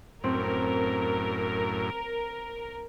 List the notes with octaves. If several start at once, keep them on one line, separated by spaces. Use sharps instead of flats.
F#2 A2 C4 A#4